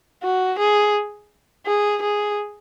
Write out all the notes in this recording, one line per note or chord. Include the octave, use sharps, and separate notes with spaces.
F#4
G#4
G#4
G#4